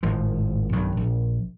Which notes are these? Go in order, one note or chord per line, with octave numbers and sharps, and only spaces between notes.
G#1 A2 F3
B1 G2 D#3
A#1